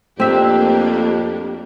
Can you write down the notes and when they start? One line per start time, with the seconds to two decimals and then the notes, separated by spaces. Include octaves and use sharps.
0.20 F2 A3 A#3 C4 D4 G4 E5